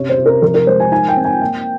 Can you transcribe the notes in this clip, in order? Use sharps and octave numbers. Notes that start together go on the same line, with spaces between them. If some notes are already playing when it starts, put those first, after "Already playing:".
Already playing: C3 C#4 C#5
C5
C3
A#4
F3 A#4
A#4
G#3 C5
G#5
D#4 G#5
G5
C4
G#5
A#3 G5